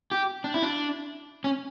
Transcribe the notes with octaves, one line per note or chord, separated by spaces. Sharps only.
G4
D4
E4
D4
C#4